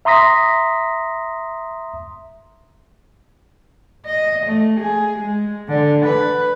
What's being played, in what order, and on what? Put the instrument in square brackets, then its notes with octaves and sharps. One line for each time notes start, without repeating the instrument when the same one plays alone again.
[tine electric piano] E5 A#5 C6 D#6 A#6 B6
[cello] D#5
A3
G#4
G#3
D3
B4